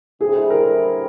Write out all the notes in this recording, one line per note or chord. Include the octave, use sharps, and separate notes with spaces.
D3 G3 C4 E4 G#4
A#4